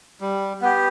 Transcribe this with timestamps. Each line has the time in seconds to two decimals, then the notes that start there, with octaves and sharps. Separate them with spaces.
0.21 G3
0.61 B3 G4